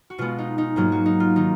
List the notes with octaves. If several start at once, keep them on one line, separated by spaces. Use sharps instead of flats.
F#4
B2 G#3 B3 F4
D#4
D#4
G#2 F#3 A#3 F4
F#4
D#4
F4
D#3 A#3 D#4